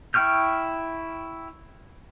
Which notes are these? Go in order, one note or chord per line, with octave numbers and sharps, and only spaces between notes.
E4 G5 C#6 F6 G6